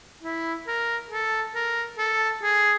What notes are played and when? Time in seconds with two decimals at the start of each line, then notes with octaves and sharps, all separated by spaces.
0.24 E4
0.67 A#4
1.11 A4
1.55 A#4
1.98 A4
2.43 G#4